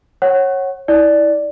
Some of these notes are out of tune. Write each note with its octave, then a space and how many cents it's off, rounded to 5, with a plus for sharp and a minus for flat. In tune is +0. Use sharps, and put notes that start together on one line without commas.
C#5 -20 F#5 +10
E4 -25 D5 +0